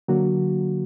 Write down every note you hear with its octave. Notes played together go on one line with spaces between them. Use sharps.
D3 F#3 A#3 F#4